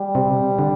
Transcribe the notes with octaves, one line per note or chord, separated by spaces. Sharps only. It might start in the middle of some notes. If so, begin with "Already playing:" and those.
Already playing: G3
C3
D3